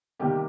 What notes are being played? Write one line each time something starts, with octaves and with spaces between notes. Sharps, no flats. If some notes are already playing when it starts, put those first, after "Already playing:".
C3 D#3 G3 A#3 G4